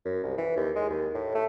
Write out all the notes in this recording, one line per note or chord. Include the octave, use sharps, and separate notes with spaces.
F#2
C2
E3
D#2
G#3
D#2
A2
A3